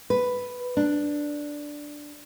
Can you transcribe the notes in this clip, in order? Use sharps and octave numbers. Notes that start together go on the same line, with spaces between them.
B4
D4